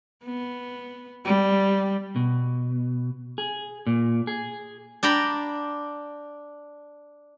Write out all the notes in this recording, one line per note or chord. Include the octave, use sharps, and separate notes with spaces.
B3
G3
B2
G#4
A#2
G#4
D4 D5 G5 A#5 B5